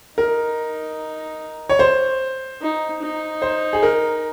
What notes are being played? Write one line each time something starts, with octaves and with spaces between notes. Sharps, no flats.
D#4 A#4
C#5
C5
D#4
D#4
C5
G#4
A#4